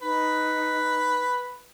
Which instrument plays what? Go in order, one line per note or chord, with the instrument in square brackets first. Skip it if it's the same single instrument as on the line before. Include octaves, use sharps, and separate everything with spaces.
[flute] D#4 [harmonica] B4